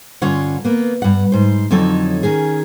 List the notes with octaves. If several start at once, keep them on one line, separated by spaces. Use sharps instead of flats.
G2 D3 C#4 F4 C#5 F#5
A#3 B3
G2 F#5
G#2 C5
F2 D3 F#3 D#4 A4 C#5
D#3 C#4 G#4